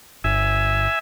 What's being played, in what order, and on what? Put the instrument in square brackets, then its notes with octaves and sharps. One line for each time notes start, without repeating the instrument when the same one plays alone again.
[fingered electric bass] G1 [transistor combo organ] E5 G#5